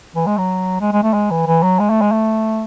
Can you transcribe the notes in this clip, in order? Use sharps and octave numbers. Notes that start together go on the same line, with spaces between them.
E3
G#3
F#3
G#3
G#3
A3
G#3
E3
E3
F#3
G#3
A3
G#3
A3